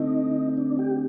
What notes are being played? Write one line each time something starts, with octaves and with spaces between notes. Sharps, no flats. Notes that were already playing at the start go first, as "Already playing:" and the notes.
Already playing: D3 A3 C4 D#4
D4
G4